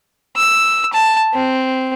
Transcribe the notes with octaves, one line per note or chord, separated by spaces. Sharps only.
E6
A5
C4